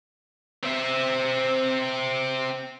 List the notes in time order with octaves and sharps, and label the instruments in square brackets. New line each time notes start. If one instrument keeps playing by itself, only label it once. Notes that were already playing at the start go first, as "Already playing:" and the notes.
[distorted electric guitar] C4 E5